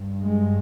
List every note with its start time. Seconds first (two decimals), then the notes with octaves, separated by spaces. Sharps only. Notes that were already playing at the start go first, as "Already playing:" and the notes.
Already playing: G2
0.22 G#3